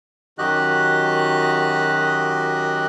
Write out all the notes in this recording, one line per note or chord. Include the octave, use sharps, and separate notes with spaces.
F#2 D#3 F#4 G4 D#5 F#6